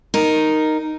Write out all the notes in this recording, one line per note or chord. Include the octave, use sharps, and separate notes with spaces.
D#4 A#4